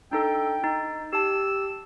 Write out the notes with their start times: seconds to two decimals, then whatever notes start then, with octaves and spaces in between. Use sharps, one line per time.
0.11 D4 D#4 A4 G5
0.64 D#4
1.13 G4 A5 E6